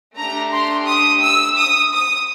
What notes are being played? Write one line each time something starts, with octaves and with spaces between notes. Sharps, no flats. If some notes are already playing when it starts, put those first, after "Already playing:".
A3 D4 G4 A#5
C6
D#6
E6
D#6
D#6